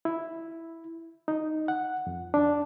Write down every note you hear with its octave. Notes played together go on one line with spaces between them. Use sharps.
E4
D#4
F#5
F2
D4